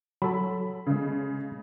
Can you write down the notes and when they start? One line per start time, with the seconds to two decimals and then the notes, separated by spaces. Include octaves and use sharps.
0.22 F#3 A4 B5
0.87 C#3 G#3